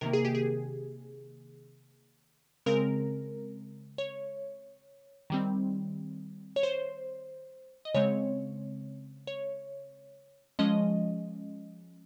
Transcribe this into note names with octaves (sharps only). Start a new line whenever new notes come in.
C3 D#3 A#3 A#4
G#4
G4
G#4
C#3 G#3 C4 A#4
C#5
D#3 G3 C4
C#5
C5
D#5
C#3 G#3 C4 C#5
C#5
F3 G#3 C#4 D#5